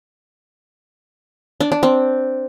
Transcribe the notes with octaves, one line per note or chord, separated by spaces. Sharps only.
D4
D4
C4